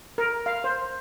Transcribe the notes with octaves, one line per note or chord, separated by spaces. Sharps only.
A#4
F5
C5